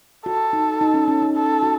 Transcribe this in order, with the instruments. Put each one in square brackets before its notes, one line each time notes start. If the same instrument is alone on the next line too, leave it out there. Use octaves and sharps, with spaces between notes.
[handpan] F#4 [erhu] A4
[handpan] D#4
D#4
C#4
C#4
D#4
[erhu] A4
[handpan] F#4